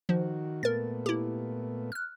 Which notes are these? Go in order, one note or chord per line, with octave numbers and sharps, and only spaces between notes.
D#3 F3 F#4
A#2 A3 B3 A#4 A6
E4 G4
F6 F#6